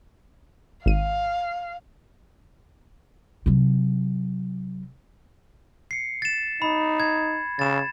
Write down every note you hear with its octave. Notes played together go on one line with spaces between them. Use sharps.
G#1 F5 D#7
C3 F#3
C7 C#7
A6 E7
D#4 B5
G#6
C#3 A6 E7